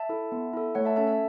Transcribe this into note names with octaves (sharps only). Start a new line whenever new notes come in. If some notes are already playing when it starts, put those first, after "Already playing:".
Already playing: E5 A5
E4 A4
B3
E4 A4
A3 C#5 F#5
E5 A5
C#4 A4 E5 A5
E5 A5